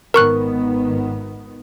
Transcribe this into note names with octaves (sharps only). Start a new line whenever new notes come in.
G#1 D#3 B3 A#4 C#6 F#6